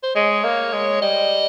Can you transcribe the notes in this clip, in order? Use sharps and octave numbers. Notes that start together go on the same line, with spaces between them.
C5
G#3 C#5
A#3
G#3
G3 D#5